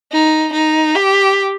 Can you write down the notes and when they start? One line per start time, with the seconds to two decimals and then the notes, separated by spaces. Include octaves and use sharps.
0.12 D#4
0.53 D#4
0.95 G4